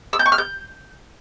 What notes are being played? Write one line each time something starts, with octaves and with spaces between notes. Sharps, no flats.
E6
G6
C#6
F6
G6